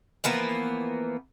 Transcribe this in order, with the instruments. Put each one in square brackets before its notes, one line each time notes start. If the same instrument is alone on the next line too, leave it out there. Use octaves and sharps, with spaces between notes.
[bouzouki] E3 F3 A#3 B3